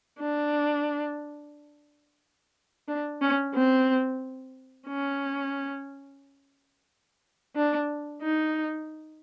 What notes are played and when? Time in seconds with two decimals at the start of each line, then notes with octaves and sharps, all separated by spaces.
0.20 D4
2.88 D4
3.21 C#4
3.54 C4
4.88 C#4
7.56 D4
8.22 D#4